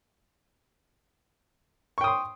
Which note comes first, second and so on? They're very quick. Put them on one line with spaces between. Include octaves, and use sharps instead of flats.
C#6 G5 D#6 C6